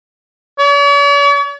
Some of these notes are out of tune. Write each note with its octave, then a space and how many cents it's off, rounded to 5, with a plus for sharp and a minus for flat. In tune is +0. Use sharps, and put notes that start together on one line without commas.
C#5 +45